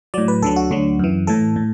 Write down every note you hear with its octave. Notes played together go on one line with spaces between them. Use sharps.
A2 F#3 D5
B4
D2 D3 F#3 A4
F#4
D2 D3 F#3
F#2 E3
A2 E3 A4
A2